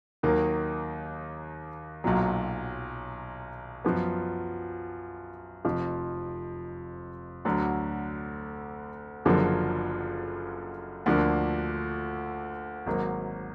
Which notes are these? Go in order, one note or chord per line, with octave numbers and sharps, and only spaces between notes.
D#2 D#3 F#3 A#3
B1 A#2 F#3
F#2 F3 B3
F1 F2 F3
D2 D3 F#3
F#1 F#2 D3 F3 A#3
D2 D3 F3 A#3 D4
G#1 G#2 F#3 A#3